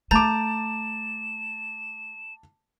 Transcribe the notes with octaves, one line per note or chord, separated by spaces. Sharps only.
A3 A5 A#5 D6 G6 A6 E7